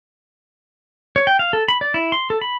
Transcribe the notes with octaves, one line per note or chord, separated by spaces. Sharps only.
C#5
G5
F5
A4
B5
D5
E4
C6
A4
B5